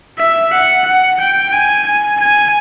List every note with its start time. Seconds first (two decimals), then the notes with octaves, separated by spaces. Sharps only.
0.18 E5
0.53 F#5
0.85 F#5
1.20 G5
1.53 G#5
1.86 G#5
2.20 G#5